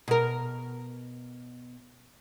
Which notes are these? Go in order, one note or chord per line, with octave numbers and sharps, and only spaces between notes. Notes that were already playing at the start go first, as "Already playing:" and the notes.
B2 A#4